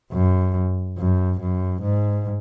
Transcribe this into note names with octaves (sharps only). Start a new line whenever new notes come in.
F#2
F#2
F#2
G#2